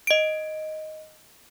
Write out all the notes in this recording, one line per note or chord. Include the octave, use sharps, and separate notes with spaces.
D#5 D7